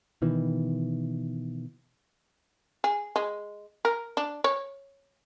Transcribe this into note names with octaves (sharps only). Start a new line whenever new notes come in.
B2 D#3 E3
G#4
G#3
A#4
D4
C#5